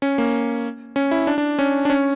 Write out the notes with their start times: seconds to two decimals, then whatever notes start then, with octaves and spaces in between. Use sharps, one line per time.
0.02 C#4
0.18 A#3
0.96 C#4
1.11 E4
1.27 D4
1.38 D4
1.59 C#4
1.85 D4
1.90 C#4